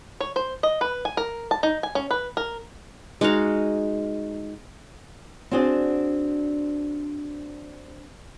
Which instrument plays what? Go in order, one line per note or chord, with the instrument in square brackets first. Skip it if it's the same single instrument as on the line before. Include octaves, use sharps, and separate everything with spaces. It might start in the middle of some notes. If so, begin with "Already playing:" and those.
[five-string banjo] C#5
C5
D#5
B4
G#5
A#4
A5
D#4
G#5
C#4
B4
A#4
[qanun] G#3 D#4 F#4 F5
[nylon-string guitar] C4 D4 F#4 G#4 C5 D5